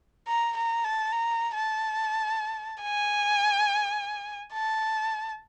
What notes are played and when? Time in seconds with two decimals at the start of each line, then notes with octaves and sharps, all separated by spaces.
0.27 A#5
0.56 A#5
0.84 A5
1.12 A#5
1.55 A5
2.82 G#5
4.53 A5